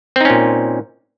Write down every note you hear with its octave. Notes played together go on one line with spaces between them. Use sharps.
A#2 C4 C#4 D#4